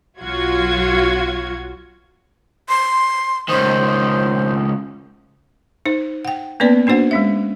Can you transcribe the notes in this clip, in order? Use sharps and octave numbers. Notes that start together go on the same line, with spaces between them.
B1 F#3 F4 F#4 G#6
C6
C#2 D#3 C5
D#4 C5
F#5 G5
A#3 B3 C#4 B4 D5 A5
A#3 D4 F#4 C5 F#5
G#3 C#4 E5